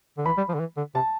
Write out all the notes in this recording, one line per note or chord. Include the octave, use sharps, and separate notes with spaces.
D3
E3 B5
G3
F3
D3
E3
D3
C3 A5